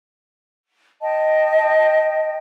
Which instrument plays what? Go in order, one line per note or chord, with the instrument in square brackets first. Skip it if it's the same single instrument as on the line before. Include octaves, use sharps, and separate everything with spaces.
[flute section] D#5 G5 A5